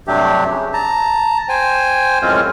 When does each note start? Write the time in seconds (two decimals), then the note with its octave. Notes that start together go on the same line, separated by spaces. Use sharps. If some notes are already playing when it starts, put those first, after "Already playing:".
0.08 G2 C3 F#3 A3 D4 G4
0.50 C#3
0.73 A5 A#5
1.49 C5 G5 G#5
2.22 F#2 A2 G#3 C4 C#4 F4